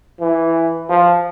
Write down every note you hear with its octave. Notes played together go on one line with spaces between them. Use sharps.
E3
F3